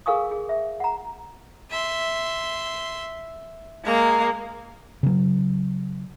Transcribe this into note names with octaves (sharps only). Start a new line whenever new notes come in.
G#4 A#4 F5 G#5 C#6 D#6
G#4
E5
F#5 A#5
E5 C6
G#3 A#3 F5 A#5
C#3 F#3